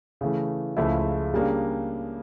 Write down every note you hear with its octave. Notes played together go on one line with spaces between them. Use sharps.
C#3 E3 A3
C#2 C#3 F3 A3 E4
C#3 G3 A#3 D4